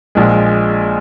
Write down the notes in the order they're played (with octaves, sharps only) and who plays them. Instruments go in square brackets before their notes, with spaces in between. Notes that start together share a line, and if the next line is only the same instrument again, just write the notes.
[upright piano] A#1 A#2 G#3